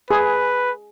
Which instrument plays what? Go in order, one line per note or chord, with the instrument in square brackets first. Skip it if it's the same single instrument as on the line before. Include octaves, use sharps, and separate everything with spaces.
[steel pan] G#4 [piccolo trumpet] B4